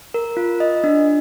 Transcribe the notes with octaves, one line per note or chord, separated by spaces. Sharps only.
A#4
F4
D#5
D4